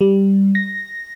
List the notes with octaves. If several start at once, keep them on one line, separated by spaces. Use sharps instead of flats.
G3
A#6